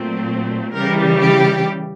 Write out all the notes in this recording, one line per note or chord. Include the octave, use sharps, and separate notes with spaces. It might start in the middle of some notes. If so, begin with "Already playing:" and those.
Already playing: A#2 F#3 A3 C4
C#3 E3 G3 A#4
G4